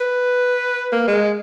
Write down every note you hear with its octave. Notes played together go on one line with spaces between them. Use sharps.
B4
A#3
G#3